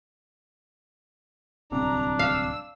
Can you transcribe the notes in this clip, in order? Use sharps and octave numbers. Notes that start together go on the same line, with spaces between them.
D1 C2 C4 D4 A#5
F5 E6